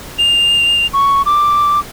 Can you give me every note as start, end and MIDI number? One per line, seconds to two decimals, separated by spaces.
0.19 0.87 101
0.93 1.22 85
1.26 1.80 86